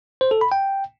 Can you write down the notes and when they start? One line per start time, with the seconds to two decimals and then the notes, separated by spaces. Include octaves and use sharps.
0.21 C5
0.31 A4
0.41 B5
0.52 G5